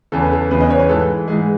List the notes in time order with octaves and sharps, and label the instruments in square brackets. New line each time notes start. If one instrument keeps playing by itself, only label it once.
[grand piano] E2 C#3 E3 A4
B4
A4
E2 C#3 E3 B3 B4
D#5
C#5
B4
G#2 E3 G#3 A4
G#2 E3 G#3 G#4